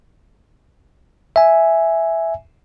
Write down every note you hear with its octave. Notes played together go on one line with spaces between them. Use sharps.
E5 G#5